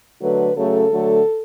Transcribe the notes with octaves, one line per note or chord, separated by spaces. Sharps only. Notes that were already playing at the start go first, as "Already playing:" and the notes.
D3 F#3 A3 B4
C#3 F#3 A3 A4
D3 F#3 A3